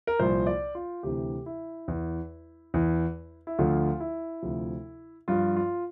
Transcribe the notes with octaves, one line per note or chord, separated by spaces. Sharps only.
A#4
C2 A#2 F3 C5
D5
F4
D2 C3 E3 G4
E4
E2 E3
E2 E3
E4
D2 D3 F3 F4
E4
D2 C3 F3
G2 F3 F4
F4